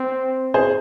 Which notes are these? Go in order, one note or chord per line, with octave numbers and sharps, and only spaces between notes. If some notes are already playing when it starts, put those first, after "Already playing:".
Already playing: C4
G#4 C5